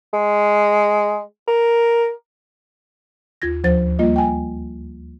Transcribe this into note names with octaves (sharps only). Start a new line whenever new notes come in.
G#3
A#4
D#2 F4 G#6 A#6
D2 F3 C5 A6
G3 A#3 F4 D#5
G5 G#5